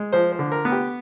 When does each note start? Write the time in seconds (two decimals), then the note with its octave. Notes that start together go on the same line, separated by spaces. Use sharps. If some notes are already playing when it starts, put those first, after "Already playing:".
Already playing: G#3
0.13 F3 C5
0.32 C5
0.39 D3
0.52 A#4
0.65 B3
0.72 G4